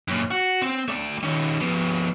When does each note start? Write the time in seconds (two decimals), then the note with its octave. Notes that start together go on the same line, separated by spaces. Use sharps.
0.08 F#2 A#2
0.31 F#4
0.62 C4
0.88 A3 D5
1.24 D#3 C#4
1.60 F3 B3